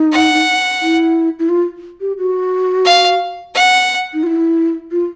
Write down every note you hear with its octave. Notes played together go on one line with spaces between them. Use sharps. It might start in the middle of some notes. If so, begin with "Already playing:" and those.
Already playing: D#4
F#5
E4
E4
F4
G4
F#4
F5
F#5
D#4
F4
E4
F4